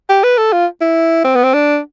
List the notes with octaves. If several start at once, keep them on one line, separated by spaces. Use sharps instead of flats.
G4
B4
A4
F4
E4
C4
B3
C4
D4